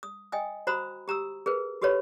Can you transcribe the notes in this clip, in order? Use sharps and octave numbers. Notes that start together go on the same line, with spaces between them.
D#6
D#5 G5 G#5 D#6
F#4 C5 A#5 B5 D#6
G4 A#5 D#6 E6
G#4 A#4 B4
F#4 G4 A4 B4 C#5 B5